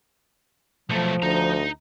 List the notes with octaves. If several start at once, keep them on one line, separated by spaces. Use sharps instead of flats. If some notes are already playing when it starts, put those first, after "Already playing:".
B1 F3 A3
D2 D#4 A#5